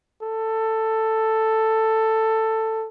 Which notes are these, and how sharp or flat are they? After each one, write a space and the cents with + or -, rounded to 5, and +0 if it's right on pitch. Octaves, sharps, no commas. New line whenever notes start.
A4 +10